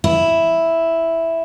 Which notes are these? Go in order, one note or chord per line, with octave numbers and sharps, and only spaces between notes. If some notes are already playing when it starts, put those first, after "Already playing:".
E4